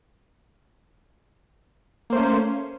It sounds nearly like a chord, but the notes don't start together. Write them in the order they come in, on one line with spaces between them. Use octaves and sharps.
A#3 C5 A3 C#4